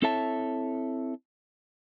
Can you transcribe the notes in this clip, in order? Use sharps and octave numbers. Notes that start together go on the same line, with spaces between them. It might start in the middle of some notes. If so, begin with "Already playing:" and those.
C4 E4 A4 C#5 E5 A5